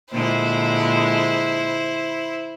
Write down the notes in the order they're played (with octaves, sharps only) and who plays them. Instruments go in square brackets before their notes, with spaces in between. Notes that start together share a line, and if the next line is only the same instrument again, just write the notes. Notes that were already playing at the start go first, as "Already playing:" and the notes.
[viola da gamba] A#2 D3 G#3 [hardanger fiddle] E4 C5